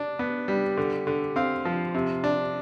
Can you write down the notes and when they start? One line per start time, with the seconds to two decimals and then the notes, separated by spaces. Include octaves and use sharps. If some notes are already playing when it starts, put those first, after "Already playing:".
Already playing: D4
0.19 B3
0.48 G3
0.77 D3
1.07 D3
1.36 C4 F5
1.65 F3
1.94 C3
2.24 D4